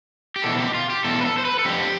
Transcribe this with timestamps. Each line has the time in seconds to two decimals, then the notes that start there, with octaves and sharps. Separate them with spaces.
0.36 G4
0.44 E2 B2 A4
0.59 G4
0.75 F4
0.90 G4
1.04 E2 B2 A4
1.21 B4
1.25 A4
1.38 C5
1.45 B4
1.59 A4
1.65 F2 D3 F3 G4